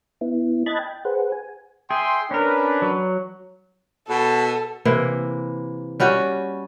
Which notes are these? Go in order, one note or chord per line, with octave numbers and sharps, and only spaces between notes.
B3 E4
D#5 A5 B5 F#6 G#6 A6
G5
G#4 B4 C5 F#5
G#5
G#4 E5 G5 C6
C#4 D4 A#4 B4
F#3
B2 A4
C3 E3 A#3
G3 C#4 F#4 G4